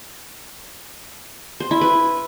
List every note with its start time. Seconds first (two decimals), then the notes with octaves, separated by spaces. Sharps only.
1.60 C5
1.71 E4
1.81 B4